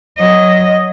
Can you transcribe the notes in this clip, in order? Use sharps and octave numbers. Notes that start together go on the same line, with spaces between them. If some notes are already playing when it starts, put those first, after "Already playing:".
F#3 D#5